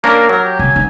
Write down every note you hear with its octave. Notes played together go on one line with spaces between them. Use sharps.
A#3 C#4 D4 A#4
F#3 A#4
G4
C#3 G#5
D#4